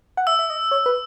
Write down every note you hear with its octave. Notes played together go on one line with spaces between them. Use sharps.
F#5
E5 E6
E5
D#5
C#5
B4